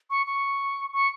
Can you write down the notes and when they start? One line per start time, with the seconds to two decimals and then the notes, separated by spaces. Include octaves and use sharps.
0.10 C#6
0.27 C#6
0.93 C#6